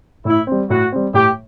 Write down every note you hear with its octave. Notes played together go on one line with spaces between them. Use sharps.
A2 E4
G3 C4
A2 F#4
G3 C4
A2 G4